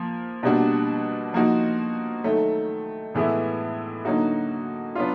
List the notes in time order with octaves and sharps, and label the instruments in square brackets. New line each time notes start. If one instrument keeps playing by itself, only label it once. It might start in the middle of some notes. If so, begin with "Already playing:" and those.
Already playing: [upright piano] F3 A#3
B2 G3 A#3 D4 F#4
F3 A#3 D#4 F#4
D#3 F#3 A3
A2 E3 G#3 B3 E4
D3 F#3 A#3 D#4 F#4
F#3 B3 D4 F4